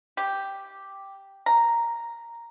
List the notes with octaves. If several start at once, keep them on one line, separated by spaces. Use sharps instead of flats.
G4
A#5